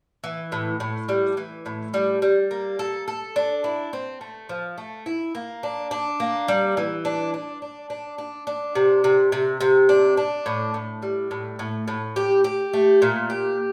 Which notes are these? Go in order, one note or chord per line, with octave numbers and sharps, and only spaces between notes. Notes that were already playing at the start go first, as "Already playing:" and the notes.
E3
A2
A2
G3
E3
A2
G3
G3
A#3
A4
A4
D4
E4
C4
A3
F3
A3
E4
A#3
D4
D4
A#3
G3
E3
D4
D4
D4
D4
D4
D4
C3
C3
C3
C3
D4
D4
A2
A2
G3
A2
A2
A2
G4
G4
A3
A#2
G4